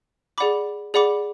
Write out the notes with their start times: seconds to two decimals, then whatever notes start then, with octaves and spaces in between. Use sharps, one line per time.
0.38 G#4 D5 F#5 B5 D6
0.94 G#4 D5 F#5 B5 D6